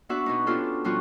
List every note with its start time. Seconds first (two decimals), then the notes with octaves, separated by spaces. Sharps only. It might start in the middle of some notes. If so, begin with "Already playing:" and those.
0.09 B3 D4 F#4 B4 E5 F#5
0.26 B2 B3 D#4
0.46 B3 C#4 D4 F4 G4 A4
0.84 B2 F3 G3 B3 F4 F#4